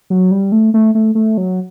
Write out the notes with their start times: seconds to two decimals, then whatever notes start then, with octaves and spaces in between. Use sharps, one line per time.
0.10 F#3
0.31 G3
0.52 A3
0.74 A3
0.95 A3
1.15 A3
1.37 F#3